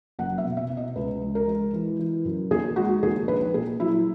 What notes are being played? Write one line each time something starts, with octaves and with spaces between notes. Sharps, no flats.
F#1 F#5
E5
B2
E5
B2
D#5
C#2 B4
G#3
A#4
G#3
E3
E3
F#2
D#2 G#4
G#3 F#4
D#2 G#4
A#1 B4
A#2 G#4
F#3 E4